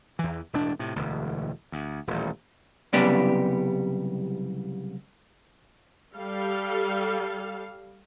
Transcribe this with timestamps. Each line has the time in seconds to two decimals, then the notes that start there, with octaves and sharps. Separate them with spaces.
0.19 E2 E3
0.53 E1 A2 D4
0.79 A2 C3
0.96 E1 D2
1.72 D2
2.07 D#1 A1
2.93 C2 F#2 C#3 G3 B3 D5
6.15 G3 A4 F5